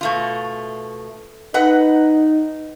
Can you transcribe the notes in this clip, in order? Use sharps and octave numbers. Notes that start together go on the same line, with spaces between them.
B2 A3 F4
D#4 B4 D#5 F#5